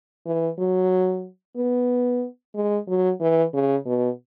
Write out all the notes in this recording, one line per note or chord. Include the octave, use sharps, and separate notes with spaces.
E3
F#3
B3
G#3
F#3
E3
C#3
B2